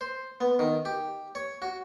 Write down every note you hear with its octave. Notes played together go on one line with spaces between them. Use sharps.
C5
B3
D#3
G4
C#5
F#4